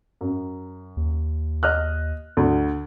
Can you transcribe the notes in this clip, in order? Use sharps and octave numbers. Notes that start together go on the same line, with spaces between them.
F#2
D#2
D#5 F6 F#6
D2